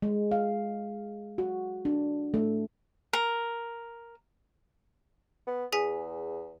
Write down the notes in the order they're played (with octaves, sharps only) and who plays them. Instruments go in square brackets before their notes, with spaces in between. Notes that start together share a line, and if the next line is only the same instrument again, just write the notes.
[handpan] G#3
F5
F#4
D4
A3
[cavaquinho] A#4
[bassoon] B3
[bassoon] E2 [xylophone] G#4 G#5 B6